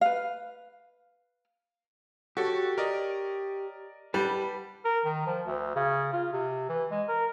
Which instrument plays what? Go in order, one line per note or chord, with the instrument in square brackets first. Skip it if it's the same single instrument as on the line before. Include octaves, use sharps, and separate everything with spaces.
[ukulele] B4 F5
[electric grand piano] F#4 A4 [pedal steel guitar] G4 C#5
[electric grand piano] A#4 D5 D#5
[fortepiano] G3 [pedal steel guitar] B4 F#5 A5
[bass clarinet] A#4
D#3
F3
D2
C#3
F4
C3
E3
G#3
A#4